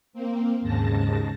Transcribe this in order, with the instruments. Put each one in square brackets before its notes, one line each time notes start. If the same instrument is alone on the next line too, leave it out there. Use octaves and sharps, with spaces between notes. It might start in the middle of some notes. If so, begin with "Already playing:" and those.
[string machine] A#3 C4
D#2 G#2 C#3 A5 A#6